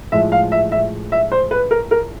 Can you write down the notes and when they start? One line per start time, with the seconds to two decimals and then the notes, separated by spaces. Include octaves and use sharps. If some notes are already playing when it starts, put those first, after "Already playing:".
0.12 A2 F3 G#3 E5
0.32 F5
0.52 E5
0.72 E5
1.12 E5
1.32 C5
1.51 B4
1.71 A#4
1.91 A#4